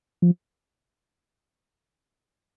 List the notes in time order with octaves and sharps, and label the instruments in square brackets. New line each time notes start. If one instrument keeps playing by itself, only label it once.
[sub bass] F3